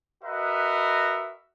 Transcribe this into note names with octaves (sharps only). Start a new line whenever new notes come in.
F#4 A#4 B4 D#5 E5